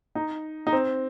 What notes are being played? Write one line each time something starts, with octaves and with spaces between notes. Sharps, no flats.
D#4
D#4
C4